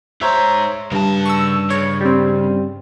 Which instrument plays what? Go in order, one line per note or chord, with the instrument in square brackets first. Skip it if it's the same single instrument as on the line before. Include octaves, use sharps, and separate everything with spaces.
[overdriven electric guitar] G#2 A#5 [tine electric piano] C5 C#5 E5
[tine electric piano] G2 [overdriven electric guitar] C#3 A5
[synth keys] C#6 E6
[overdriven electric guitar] C#3 [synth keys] C#5
[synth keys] G3 C4